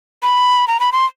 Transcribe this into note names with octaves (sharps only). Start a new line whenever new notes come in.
B5
A#5
B5
C6